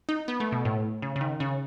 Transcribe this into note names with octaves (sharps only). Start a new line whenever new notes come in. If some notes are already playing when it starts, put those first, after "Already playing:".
D#4
B3
A3
B2
A2
C#3
C#3
D#3
C#3